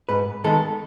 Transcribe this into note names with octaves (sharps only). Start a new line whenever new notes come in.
G#2 B4
D#3 G#3 B3 A4